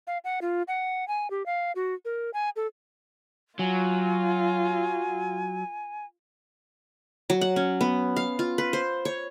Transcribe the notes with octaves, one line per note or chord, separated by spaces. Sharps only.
F5
F#5
F4
F#5
G#5
G4
F5
F#4
A#4
G#5
A4
F#3 F4 G#5
F#3
F#5
C#4
B3
F5
F4
B4
C5
C#5